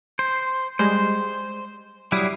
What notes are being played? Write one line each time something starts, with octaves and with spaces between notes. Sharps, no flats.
C5
G3 G#3 G#4 C5
F#3 G3 E4 D6 D#6 C7